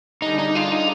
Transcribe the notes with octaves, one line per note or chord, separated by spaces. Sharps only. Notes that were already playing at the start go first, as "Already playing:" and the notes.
D3 G3 D4 D#4 G#4
D#4
F4
D#4